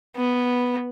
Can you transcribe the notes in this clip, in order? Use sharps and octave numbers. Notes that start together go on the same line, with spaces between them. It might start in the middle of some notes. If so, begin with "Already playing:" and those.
B3